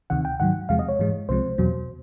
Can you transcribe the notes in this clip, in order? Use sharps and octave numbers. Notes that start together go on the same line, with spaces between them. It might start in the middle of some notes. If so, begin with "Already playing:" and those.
D2 C3 D#3 F#5
G5
G#2 D#3 F#3 F#5
E2 C3 F3 G#3 F5
D#5
C#5
G#2 E3 G#3
C2 C3 F3 G#3 C5
E2 B2 F#3